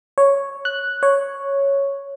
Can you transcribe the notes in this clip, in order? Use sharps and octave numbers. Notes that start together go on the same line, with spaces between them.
C#5
F#6
C#5